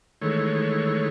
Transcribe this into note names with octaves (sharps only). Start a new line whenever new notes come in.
D#3 E3 G#3 A3 C#5